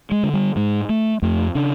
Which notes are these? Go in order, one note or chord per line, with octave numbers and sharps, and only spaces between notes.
G#3
D3
G3
G#2 G#3
A3
F2 A3
C#3 D4